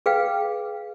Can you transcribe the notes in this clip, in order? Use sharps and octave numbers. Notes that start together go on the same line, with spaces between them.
G#4 B4 F5 G5